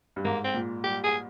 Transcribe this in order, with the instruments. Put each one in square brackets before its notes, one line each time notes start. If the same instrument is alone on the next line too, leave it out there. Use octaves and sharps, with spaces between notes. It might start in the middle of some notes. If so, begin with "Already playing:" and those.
[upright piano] G2
[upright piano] G#2 [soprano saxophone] A#3
[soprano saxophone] C4
[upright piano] A#2
[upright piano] G3 [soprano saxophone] G4
[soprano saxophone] G#4